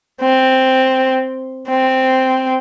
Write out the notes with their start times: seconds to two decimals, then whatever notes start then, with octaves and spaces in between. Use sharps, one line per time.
0.22 C4
1.69 C4